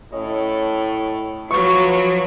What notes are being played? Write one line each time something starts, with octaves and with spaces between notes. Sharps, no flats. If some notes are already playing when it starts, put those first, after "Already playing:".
A2 C#4 C#5 D#5
F3 F#3 B4 C#6